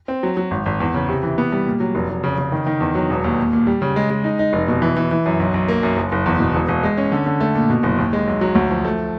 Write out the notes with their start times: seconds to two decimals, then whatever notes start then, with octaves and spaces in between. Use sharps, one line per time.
0.08 C4
0.23 F#3
0.37 F#3
0.51 G#1
0.66 G#1
0.80 E2
0.95 C#3
1.08 C3
1.23 E3
1.38 B3
1.52 G3
1.66 A#2
1.80 F#3
1.95 F1
2.09 F1
2.24 C#3
2.38 C#3
2.52 D#3
2.67 D#3
2.80 E2
2.95 F#3
3.10 E1
3.24 D#2
3.38 A#2
3.53 A#2
3.67 G3
3.82 C#3
3.96 G#3
4.10 G#3
4.24 D#4
4.39 D#4
4.53 F1
4.68 B2
4.82 E3
4.97 E3
5.11 E3
5.26 F#2
5.40 B1
5.54 B1
5.68 A#3
5.83 F#2
5.97 F#1
6.12 F#1
6.26 E2
6.40 B2
6.55 E1
6.69 E1
6.83 G#3
6.98 C#4
7.12 D3
7.26 D3
7.40 A3
7.55 A#2
7.70 B2
7.83 F#1
7.98 D#2
8.13 G#3
8.27 B1
8.41 F#3
8.55 D2
8.70 F3
8.85 A3